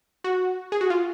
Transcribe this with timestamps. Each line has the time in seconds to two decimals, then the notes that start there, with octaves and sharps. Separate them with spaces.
0.24 F#4
0.72 G#4
0.81 F#4
0.90 F4